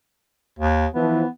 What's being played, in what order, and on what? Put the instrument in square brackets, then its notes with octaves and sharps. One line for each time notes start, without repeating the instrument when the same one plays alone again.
[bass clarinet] D#2
[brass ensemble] E3 F3 [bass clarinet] B3